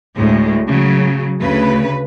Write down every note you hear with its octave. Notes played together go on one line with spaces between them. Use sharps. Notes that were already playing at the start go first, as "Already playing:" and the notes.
D2 A2 G#3
C#3 F#3
D2 C#3 B4